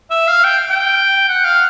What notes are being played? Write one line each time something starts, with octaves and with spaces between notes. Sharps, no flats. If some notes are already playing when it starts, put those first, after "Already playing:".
E5
F5
G5
G5
F#5
F5